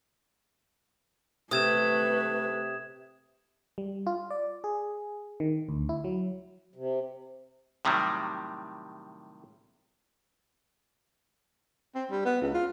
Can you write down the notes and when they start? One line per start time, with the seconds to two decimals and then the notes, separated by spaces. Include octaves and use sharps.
1.51 C3 A3 B4 D#6 G#6 E7
3.78 G3
4.07 F4
4.30 D5
4.64 G#4
5.40 D#3
5.69 D2
5.89 E4
6.04 F#3
6.76 C3
7.85 A2 C3 D#3 F#3 G3
11.95 C4
12.11 G3
12.25 B3
12.41 C#2
12.54 F4